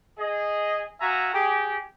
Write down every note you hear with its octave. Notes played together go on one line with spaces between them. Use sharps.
G#4 D#5
F#4 E5 F5 G#5 A#5
G4 G#4